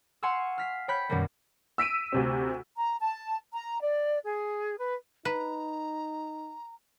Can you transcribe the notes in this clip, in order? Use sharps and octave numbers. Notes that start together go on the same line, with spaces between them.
F5 F#5 G#5 C6 C#6 E6
F6 B6 C7
C#5 G5 B5 F#6 B6
F#2 B2 D#3 G3 A#3
E6 B6 D7 D#7
D2 C3 C4
A#5
A5
A#5
D5
G#4
B4
D#4 B4 A#5